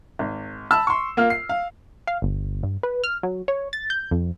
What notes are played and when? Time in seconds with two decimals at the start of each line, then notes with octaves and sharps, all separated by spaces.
0.19 G#1
0.71 A5 B5 E6
0.87 C6 C#6
1.17 A#3 F4 F6
1.30 C7
1.49 F5
2.07 F5
2.22 G1
2.63 G2
2.83 B4
3.04 F6
3.23 F#3
3.48 C#5
3.73 A6
3.90 G6
4.11 F2